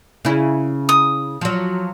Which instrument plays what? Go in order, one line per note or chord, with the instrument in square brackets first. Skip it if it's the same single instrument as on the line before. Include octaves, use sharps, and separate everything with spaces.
[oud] C#3 E4
[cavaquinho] D#6
[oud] F3 F#3